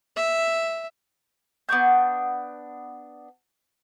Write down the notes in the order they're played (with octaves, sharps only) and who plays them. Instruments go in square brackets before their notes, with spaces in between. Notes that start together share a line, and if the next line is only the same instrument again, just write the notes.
[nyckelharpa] E5
[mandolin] B3 D4 C#6 G6